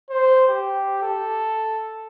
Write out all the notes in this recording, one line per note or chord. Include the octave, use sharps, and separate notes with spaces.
C5
G4
A4